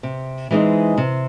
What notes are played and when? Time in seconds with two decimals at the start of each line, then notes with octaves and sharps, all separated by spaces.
0.03 C3
0.51 E3 G#3 C4 D#4
0.97 C3